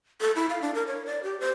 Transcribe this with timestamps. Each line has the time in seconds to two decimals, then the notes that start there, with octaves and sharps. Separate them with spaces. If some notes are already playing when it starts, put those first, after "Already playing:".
0.21 A4
0.36 E4
0.49 F5
0.62 D4
0.74 A#4
0.87 C#5
1.06 D5
1.23 G4
1.40 C5